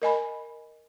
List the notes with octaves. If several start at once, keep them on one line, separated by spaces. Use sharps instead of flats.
A#4 D#5 G#5 B5